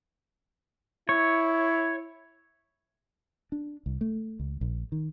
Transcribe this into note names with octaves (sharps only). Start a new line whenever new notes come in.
E4 C#5
D4
C2
A3
C#2
A#1
D#3